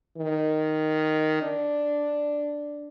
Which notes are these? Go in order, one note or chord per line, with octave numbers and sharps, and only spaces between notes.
D#3
D4